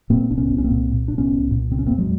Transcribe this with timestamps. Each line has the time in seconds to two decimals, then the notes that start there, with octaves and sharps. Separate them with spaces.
0.10 A#2 A#3 C4
0.30 C2 D4
0.37 B3 C#4
0.51 C2
0.58 C#4
0.64 A#3 C4
0.70 A#2
0.91 A#2
1.08 C2 D4
1.18 B3 C#4
1.31 C2
1.51 A#2
1.71 C#3 C4
1.79 C#4
1.86 E2 A#3 C4
1.98 F#3 G#3